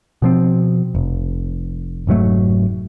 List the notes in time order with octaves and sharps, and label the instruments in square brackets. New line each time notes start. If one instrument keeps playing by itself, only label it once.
[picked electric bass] B2 F3 C4
F1
F1 G#2 F#3 A3